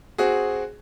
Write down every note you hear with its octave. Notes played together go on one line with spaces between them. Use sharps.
C4 F#4 G#4